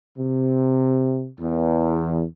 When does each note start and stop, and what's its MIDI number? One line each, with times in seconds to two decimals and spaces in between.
0.18 1.29 48
1.39 2.24 40